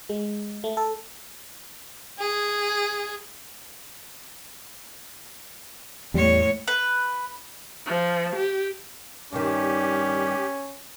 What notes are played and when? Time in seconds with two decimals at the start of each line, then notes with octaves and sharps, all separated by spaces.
0.09 G#3
0.64 A3
0.77 A4
2.19 G#4
6.14 E2 A2 G3 C#5
6.68 B4
7.87 F3
8.36 G4
9.33 G2 D#3 C#4 G4